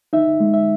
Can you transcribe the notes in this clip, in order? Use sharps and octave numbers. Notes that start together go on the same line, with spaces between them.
D#4 E5
G#3
E5